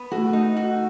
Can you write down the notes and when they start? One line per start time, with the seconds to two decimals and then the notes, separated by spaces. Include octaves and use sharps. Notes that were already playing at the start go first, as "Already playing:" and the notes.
Already playing: B3
0.12 A3 F#4
0.33 D#4
0.57 F#4